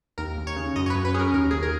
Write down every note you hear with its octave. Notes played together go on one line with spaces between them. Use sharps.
D#2 A#4
D#2
C#5
C#3
F#2 D#5
C#5
B4
F#2
B4
C#4 G#4 A#4
D#2 A#4
D#2 G#4
A#4